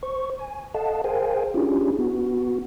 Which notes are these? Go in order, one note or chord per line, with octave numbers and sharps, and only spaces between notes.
C5 C#6
G#5
A4 D#5 F5 F#5 A5
G#4 A#4 C5 F5 G5 G#5
C#4 D4 E4 F4 G4 G#4
B3 F#4